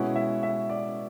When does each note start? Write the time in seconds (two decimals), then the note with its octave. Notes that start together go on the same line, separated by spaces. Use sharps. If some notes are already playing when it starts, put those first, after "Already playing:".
Already playing: B2 G#3 C#4 E4 F#5
0.16 E5
0.43 E5
0.69 D5